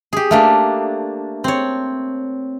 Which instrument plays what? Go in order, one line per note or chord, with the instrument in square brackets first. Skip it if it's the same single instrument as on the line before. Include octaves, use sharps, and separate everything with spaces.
[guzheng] G4 G#4
A3 A#3 D4
C4 C#5